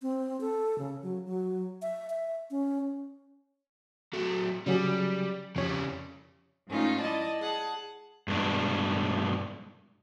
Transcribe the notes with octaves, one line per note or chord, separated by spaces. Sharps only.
C4
A4
C#3
F#3
F#3
E5
E5
C#4
F#3 A3
C#3 F#3 G3 G#4
F2 C#3 G3 C#5
G#2 A3 C#4 D#4 F4
E4 D5 D#5 A5
G#4 F#5 A5
G2 B2 G#3 D4